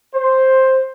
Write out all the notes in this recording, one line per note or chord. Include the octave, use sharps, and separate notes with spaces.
C5